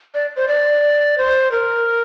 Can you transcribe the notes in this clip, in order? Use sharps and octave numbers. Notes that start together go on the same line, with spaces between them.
D5
C5
D5
C5
A#4